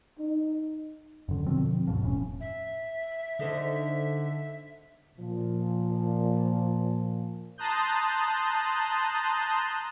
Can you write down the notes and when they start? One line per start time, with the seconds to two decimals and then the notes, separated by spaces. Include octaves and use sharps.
0.19 D#4
1.28 F#2 D3
1.46 B2 D3 F3 C4
1.87 C#2 G2 B2 F3
2.01 E1 A2 A3 C#4
2.40 E5
3.39 D3 D#4 A4 C5
5.19 A#2 F3
7.58 A5 A#5 C6 D#6 F#6 G6